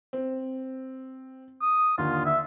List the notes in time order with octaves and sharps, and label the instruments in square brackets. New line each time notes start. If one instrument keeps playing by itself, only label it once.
[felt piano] C4
[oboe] D#6
[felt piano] D#2 D3 [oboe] F4
[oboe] E5